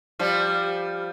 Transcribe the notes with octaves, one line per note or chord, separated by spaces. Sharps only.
F3 G3